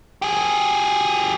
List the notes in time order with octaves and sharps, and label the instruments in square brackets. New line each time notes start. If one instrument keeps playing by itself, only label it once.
[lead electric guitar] G4 G#4